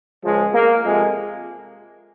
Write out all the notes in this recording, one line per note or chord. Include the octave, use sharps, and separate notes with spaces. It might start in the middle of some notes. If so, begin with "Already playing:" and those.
C#2 C#3 F3 G#3
A#3
F2 C3 F3 G#3